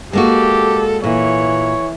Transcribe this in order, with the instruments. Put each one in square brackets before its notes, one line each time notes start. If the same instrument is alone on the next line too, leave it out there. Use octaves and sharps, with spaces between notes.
[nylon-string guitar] G#3 A#3 F#4 [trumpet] G4 [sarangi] A4
[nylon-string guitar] A#2 [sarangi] E3 [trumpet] C#5